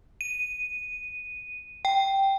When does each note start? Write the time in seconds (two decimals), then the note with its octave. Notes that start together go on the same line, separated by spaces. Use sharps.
0.21 D#7
1.85 G5